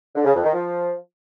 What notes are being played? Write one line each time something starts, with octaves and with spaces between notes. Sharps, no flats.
D3
C#3
F2
D#3
F3